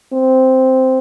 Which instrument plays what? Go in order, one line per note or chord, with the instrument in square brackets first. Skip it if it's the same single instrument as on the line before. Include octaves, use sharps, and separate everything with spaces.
[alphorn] C4